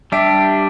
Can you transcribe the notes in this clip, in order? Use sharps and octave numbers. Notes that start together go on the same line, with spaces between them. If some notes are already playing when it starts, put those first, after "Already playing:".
G3 D4 G4 E5